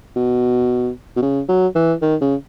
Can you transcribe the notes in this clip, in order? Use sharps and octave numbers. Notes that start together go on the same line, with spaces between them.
B2
B2
C#3
F#3
E3
D#3
C#3